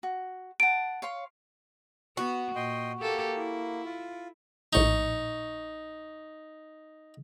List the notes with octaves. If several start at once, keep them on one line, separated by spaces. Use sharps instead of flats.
F#4
F#5 A5 D7
C#5 F5 C6
B3 F#4
A#2 D#5 G5 C6
A#3 G4 A4
E4
F4
A#1 A2 D#4 C#6 G6